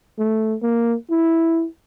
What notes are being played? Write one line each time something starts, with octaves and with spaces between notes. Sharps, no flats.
A3
A#3
E4